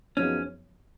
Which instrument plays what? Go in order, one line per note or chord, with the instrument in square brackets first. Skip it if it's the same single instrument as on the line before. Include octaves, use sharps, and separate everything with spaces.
[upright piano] F#2 F3 B3 D#4 G#4 [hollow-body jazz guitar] C#4